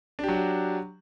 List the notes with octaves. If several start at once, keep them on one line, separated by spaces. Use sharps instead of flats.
F#3 D4 F#4 G4